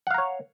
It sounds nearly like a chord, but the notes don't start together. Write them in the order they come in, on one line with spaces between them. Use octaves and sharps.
F#5 F5 A#5 C#5